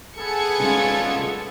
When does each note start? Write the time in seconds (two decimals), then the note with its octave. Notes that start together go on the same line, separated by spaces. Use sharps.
0.18 B3 G#4 A4 G#6 C#7
0.60 C2 G#3 C#4 F4